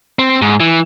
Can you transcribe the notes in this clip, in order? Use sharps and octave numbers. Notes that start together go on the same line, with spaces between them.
C4
G#2
E3